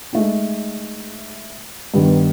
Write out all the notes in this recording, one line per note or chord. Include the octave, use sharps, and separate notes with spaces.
G#3 A3 D#4
G2 D#3 B3